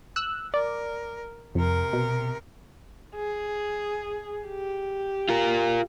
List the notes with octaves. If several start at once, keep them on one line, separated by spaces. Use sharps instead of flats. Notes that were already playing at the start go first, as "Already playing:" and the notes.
E6 F#6
A#4 D5
F2 C3 A#4
B2
G#4
G4
F4 A#4